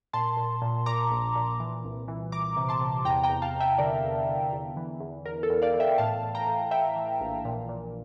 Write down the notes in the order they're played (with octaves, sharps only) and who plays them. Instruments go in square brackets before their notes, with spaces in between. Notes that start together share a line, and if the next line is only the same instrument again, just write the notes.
[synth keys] A#2 A5 C6
A#2
A#2
A#2 A#5 D6
A#1
A#2
E3
C2
E3
E3 A#5 D6
C3
A5 C6
C3
E2 G5 A#5
G5 A#5
E2
F5 A5
E2
E5 G5
D3 A#4 D5
E2
D3
E2
E3
E2
E2 A#4
A4
E2
D5 F5
E3
E5 G5
A2 F5 A5
A2
G5 A#5
A2
A2 E5 G5
E3
A#1
A#2
A#2